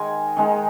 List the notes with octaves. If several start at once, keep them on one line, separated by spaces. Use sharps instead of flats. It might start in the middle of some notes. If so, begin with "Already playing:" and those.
Already playing: D#3 G#3 D#4 G#5
D#3 G#3 D#4